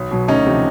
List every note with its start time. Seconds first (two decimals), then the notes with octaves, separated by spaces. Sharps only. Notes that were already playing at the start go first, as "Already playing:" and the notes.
Already playing: B1
0.11 B2 F#3
0.28 D2 C#4 D#4
0.46 C3 F3